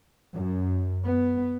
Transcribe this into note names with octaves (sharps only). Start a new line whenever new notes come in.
F#2
B3